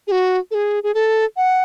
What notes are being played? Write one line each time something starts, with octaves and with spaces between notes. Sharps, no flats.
G#4
F#4
A4
G#4
G#4
A4
F#5